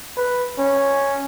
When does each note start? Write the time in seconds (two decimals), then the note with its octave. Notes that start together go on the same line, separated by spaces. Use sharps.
0.17 B4
0.58 C#4